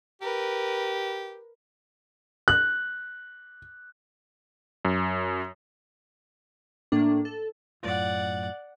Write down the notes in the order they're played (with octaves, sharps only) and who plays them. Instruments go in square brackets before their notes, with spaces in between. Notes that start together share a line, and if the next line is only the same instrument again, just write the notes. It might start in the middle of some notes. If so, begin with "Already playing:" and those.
[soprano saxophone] G4 [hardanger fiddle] A#4 B4
[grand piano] F#6
[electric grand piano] F#2
[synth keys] A2 A#3 D4
A4
[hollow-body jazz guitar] F#2 A2 F4 [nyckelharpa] D5 F#5